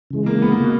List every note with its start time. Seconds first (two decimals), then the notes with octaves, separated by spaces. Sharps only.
0.10 C#3 E3 G#3
0.26 A#3
0.42 B3
0.52 A#3
0.63 B2